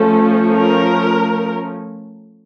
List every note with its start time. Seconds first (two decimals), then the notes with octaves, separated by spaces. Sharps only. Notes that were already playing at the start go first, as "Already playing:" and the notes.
Already playing: F3 A3 C#4 A4
0.54 A#4